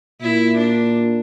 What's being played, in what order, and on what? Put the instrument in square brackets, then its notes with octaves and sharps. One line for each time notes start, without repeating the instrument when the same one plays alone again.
[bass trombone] A#2 [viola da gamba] E4
[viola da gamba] D4